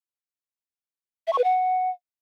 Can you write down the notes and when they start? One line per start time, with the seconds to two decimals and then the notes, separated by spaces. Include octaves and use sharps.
1.27 E5
1.33 C#6
1.38 B4
1.44 F#5